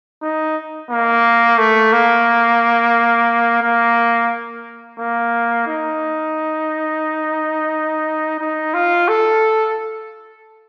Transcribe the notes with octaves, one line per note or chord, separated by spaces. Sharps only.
D#4
A#3
A3
A#3
A#3
A#3
D#4
D#4
F4
A4